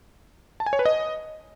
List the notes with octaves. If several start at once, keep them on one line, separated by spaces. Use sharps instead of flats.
A5
G#5
C#5
B4
D#5